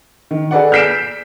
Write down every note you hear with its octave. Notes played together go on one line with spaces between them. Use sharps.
D#3
G#4 A4 B4 D5 F#5
F6 G6 B6 C7 D7 E7